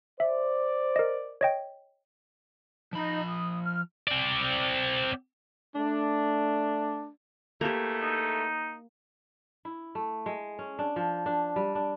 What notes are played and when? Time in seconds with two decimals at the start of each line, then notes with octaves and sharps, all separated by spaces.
0.20 C5 D5 E5
0.96 A#4 D#5
1.41 C#5 D#5 G5
2.93 F3 D#4 B5
3.28 D#6
3.63 F6
4.08 C4 D5
5.76 A3 D4
7.61 E2 A3 A#3 G4
8.02 D#4
9.65 E4
9.95 A3
10.26 G#3
10.59 C#4
10.79 D4
10.96 F3
11.26 D4
11.56 G3
11.75 D4